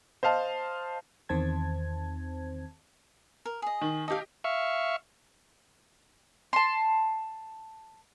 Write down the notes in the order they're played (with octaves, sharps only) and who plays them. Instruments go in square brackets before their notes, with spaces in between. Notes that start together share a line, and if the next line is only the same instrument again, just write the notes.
[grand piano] C5 D#5 F5 A5
[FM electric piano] E2 D#3 C4 C5 A5 G#6
[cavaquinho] A#4
G#4 D#5
[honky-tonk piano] D#3
[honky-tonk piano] G4 D#5 [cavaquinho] A4 D5 F5
[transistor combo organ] E5 F5 C#6
[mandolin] A5 C6